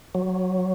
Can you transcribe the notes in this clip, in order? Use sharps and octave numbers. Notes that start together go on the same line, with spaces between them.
F#3